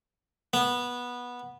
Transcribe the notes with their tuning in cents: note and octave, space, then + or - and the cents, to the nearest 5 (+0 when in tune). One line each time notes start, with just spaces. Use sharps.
B3 -15